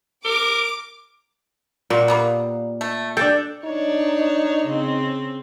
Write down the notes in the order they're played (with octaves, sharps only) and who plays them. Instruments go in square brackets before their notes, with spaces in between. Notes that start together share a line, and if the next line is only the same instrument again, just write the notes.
[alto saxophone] A#4 [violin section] D6 D7
[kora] A#2 [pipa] F4 F#4
[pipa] G3 A#3 B3
A3
[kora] D4 A4 [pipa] G5
[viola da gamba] D4 C#5 [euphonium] D#4
[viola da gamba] C#3 C4